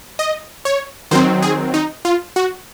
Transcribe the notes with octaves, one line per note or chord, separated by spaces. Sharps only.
D#5
C#5
D#3 F#3 C4 C5
G#4
D#4
F4
F#4